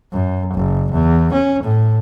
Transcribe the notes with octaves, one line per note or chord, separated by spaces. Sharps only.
F#2
F#1
E2
C#4
A2